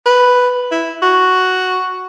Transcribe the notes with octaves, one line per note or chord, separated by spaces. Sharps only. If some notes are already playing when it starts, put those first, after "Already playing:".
B4
E4
F#4